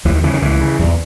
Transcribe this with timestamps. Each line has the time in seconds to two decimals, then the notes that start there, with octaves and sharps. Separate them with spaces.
0.05 D#2 E3
0.15 D#3
0.24 C#3 E3
0.34 D#3
0.42 C#2 E3
0.61 C#3
0.79 E2